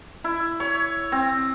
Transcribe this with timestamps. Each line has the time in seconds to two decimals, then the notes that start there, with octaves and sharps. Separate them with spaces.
0.24 E4
0.60 C#5
1.12 C4